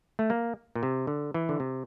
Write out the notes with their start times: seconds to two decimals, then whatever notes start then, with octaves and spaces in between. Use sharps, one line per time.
0.19 A3
0.30 A#3
0.76 A#2
0.83 C3
1.07 D3
1.34 E3
1.49 D3
1.60 C3